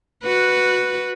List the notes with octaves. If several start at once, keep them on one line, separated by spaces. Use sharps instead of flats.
F#4 B4